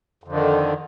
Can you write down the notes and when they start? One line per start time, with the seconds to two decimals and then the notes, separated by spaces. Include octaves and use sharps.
0.24 F2
0.28 D3
0.32 D#3